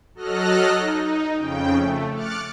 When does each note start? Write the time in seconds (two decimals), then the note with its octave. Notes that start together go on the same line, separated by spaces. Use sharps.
0.15 F#3 A4 D#5 F6 F#6 A#6
0.78 D#4
1.36 F2 C#3 G5
1.74 A3
2.14 D6 F6 F#6 A6 C#7